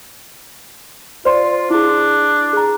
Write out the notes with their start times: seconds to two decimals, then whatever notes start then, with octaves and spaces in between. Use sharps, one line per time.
1.25 F4 C5 D5 C6
1.70 D4 E4 G#4
2.53 G#4 A#5